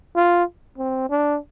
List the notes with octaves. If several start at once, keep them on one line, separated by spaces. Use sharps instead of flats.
F4
C4
D4